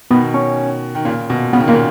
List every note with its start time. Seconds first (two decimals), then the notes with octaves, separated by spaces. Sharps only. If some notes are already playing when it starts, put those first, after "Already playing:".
0.11 B2 D#3 B3
0.34 C#4
0.95 D#3
1.05 A#2 C#3
1.30 B2
1.53 C#3 B3
1.60 D#3
1.68 A#2 C#3 A#3